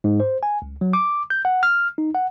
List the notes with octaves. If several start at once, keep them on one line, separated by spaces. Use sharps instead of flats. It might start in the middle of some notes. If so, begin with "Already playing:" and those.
G#2
C5
G#5
C#2
F#3
D6
G6
F#5
F6
D#4
F#5